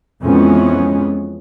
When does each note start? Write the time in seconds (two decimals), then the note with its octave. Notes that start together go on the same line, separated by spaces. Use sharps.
0.24 F2 E3 G#3 B3 C#4